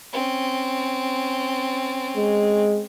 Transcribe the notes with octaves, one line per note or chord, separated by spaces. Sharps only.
C4 C#4
G#3